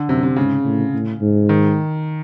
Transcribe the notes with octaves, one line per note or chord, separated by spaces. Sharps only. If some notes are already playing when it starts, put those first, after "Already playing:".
Already playing: D3
F#2 C3
C3
G#2 C#3
A2
A2
G#2
D#3